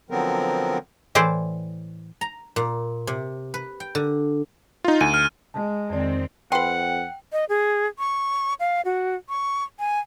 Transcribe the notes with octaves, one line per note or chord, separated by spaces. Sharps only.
D3 F3 F#3 B3 C4 A#4
A2 E3 E4 C5 D5
A#5
A#2
C3
B4
G5
D3
D#4 F4
D2 G#5 D#7
F6
G#3 A5
F2 D#3 C4 D5
F2 B4 F#5 G5 C6
D#5
G#4
C#6
F5
F#4
C#6
G#5